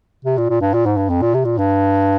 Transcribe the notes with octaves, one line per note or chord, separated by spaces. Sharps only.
C3
A#2
A#2
G2
A#2
G#2
G2
F2
A#2
C3
A#2
G2